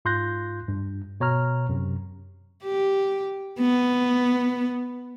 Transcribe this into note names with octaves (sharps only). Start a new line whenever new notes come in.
G#2 F4 C6 F#6 G6 A#6
G2
B2 C#5 A#5 F6
F#2 C3
G4
B3